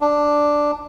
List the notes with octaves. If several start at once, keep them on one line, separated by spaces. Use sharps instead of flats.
D4